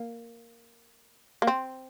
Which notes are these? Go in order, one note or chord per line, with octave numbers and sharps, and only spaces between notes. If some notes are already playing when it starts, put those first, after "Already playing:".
Already playing: A#3
A#3
C4